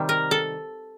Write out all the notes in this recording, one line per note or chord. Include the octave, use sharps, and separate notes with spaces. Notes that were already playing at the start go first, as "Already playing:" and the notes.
Already playing: C3 D#3 G3
A#4
A4